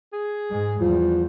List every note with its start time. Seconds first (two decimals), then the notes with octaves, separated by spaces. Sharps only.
0.13 G#4
0.50 G#2 G#3
0.81 E2 F3 G3